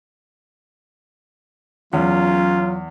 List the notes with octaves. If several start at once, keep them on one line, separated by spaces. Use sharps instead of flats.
E2 F#3 C#4 F4